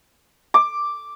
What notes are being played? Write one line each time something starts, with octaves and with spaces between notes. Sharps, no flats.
D6